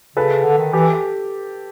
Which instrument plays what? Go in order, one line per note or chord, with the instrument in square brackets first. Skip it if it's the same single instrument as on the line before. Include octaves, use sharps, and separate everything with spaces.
[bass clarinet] C#3 [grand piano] A4 B4
[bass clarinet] D3
D#3
[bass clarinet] E3 [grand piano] G4 A4